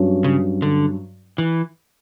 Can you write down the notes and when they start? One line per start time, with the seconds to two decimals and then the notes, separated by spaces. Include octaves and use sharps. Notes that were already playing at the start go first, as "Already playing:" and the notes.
Already playing: G2 F#3 C#4
0.24 C#3
0.62 D3
1.38 E3